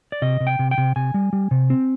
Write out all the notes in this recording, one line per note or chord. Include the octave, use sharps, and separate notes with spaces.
D5
C3 D#5
C3
G5
C3
G5
C3
C3 G#5
G3
G3
C3
C4